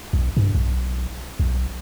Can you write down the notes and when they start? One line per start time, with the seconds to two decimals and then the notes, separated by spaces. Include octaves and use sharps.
0.13 B1
0.37 G2
0.55 B1
1.39 B1